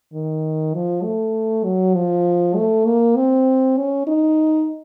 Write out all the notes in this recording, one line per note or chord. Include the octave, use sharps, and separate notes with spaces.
D#3
F3
A3
F#3
F3
A3
A#3
C4
C#4
D#4